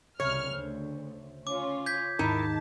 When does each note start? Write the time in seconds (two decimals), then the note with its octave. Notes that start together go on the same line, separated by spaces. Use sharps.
0.20 C2 C#3 C#5 E5 F6 E7
0.53 D2 C5
1.47 C#4 F4 D6
1.86 G6 G#6 B6
2.19 D#2 G#2 D#3 D#4 E4 A#4 A5